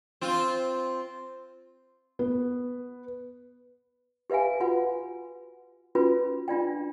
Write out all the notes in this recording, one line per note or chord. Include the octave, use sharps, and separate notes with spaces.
C4 F4
B3
G4 B4 E5 F5 G#5
F4 F#4 B4 F#5
C#4 F4 F#4 B4
D4 F4 D5 G5